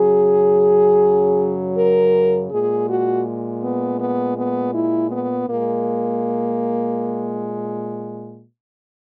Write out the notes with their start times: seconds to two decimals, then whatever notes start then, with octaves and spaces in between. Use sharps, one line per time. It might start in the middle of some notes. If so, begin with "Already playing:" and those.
Already playing: F#2 C#3 F#3 G#4
1.76 A#4
2.50 A#2 G#3 G#4
2.88 F#4
3.62 B3
4.00 B3
4.37 B3
4.73 E4
5.10 B3
5.48 A#2 G#3 A#3